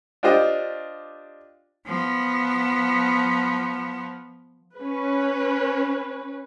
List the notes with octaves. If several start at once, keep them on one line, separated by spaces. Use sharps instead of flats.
D4 F4 G4 C5 D#5
F3 B3
C#4 B4